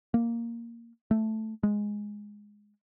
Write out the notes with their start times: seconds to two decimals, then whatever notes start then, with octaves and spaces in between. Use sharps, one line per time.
0.14 A#3
1.11 A3
1.63 G#3